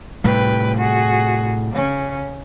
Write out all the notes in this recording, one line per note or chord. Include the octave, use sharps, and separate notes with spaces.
A2 C3 G3 B4 G5
F#4 G#4
C#3 C#4